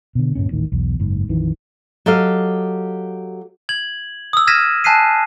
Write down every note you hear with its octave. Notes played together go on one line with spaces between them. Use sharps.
B2 D3
D2 G2 A#2 C#4
D#1 A1 A2 D#3
B1 E2
F#1 G#2
A#1 F2 D#3 E3
F#3 G4 A4 D#5 F5
G#6 F#7
D#6 E6
F6 G#6 A#6 B6 D#7 E7
G#5 A5 F#6 B6 C7 D#7